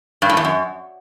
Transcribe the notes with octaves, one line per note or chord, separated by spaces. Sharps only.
G2
A2
E2
F#2